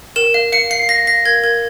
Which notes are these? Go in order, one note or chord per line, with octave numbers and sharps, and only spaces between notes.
A#4 E7
F5
F5 C#7
F5 C7
F5 A#6
F5 A#6
A#4 G#6
A#4 G#6